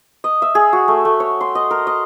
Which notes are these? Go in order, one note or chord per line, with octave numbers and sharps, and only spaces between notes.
D#5
E5
G#4
F#4
A3
A3
C#5
C6
D#5
A#4
D#5